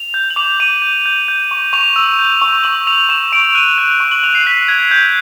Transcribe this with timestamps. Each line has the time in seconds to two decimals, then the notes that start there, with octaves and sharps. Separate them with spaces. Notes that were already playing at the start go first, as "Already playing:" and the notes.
Already playing: F7
0.14 G6
0.30 F#7
0.36 D6 F7
0.60 D6 D#7
0.82 G6
1.06 G6
1.28 G6
1.51 C#6
1.73 C#6 F7
1.96 E6
2.19 G6
2.42 C#6
2.64 C#6 F#7
2.87 E6 F7
3.09 C#6 E7
3.32 C#6 D7
3.55 F#6 D#7
3.78 F#6 F7
4.00 C#6
4.11 F#7
4.23 C#6 F7
4.35 C7
4.47 F#6 B6
4.68 F#6 G#6
4.91 G6